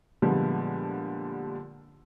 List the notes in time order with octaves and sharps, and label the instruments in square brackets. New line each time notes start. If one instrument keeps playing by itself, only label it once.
[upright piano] A#2 D3 F3 G3 G#3 B3